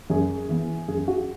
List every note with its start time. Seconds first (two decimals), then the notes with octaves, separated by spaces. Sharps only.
0.10 F#2 G#4
0.49 E3 B3
0.88 F#2 G#4
1.08 F#4